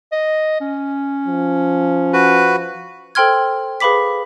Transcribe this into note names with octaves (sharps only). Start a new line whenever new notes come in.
D#5
C#4
F3
F#4 B4
A4 C5 G5 C6 F6 G#6
G#4 B4 F5 B5 D6 B6